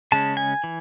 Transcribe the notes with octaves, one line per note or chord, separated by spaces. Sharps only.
C#3 G#3 C#4 A5
G#5
E3